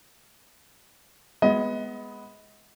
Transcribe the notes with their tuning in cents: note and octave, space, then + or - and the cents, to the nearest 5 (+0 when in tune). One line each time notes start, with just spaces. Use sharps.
G#3 +0 B3 +0 D#5 +30